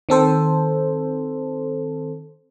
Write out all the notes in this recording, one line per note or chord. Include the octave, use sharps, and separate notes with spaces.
D#3 C4 A4 C5